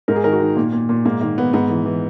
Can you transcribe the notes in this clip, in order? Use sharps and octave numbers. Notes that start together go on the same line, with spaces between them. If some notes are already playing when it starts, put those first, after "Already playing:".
G#2 A#4
G#4
D#3 A#4
F#4
D#3
A#2 A#3
A#2
A#2
G#2 A#3
D#3 A#3
D#3 B3
G#2 B3
E3
E3